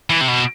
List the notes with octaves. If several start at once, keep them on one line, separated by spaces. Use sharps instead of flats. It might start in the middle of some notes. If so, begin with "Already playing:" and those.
E3
C3
B2